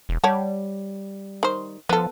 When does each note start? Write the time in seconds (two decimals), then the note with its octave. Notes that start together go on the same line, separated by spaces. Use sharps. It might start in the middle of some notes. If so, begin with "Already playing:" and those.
0.09 E1
0.24 G3 C#5 F#5 A5
1.43 D#3 C5
1.89 F3 B3 A4